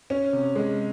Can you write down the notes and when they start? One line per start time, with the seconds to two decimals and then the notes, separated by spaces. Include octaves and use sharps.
0.10 C#4
0.33 C3
0.56 G#3